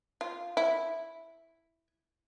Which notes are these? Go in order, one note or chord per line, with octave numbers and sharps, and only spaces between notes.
F4
E4